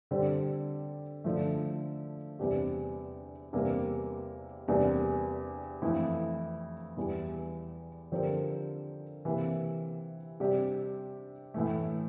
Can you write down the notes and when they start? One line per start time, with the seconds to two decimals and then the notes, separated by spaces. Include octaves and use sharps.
0.11 D3 G3 C4
1.24 D3 F3 A3
2.39 E2 C3 G3 D4 G4
3.53 E2 C3 G3 A#3
4.68 E2 C3 G3 A#3 D4
5.82 F2 E3 A3 E4
6.97 E2 E3 G3
8.12 D3 F3 C4 G4 A#4
9.25 C3 E3 A#3
10.40 C3 G3 D4 G4
11.54 A2 E3 A3